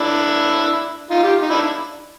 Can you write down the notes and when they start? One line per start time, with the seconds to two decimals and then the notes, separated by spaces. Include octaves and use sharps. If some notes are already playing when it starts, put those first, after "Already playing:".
Already playing: D4 E4
1.10 D#4 F4
1.23 F4 G4
1.42 D#4
1.50 D4 E4